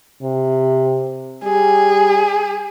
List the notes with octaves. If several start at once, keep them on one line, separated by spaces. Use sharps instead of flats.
C3
G3 G#4